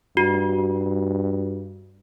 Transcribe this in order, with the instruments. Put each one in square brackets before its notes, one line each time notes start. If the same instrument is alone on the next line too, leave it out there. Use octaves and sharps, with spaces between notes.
[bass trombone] G2 [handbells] F#4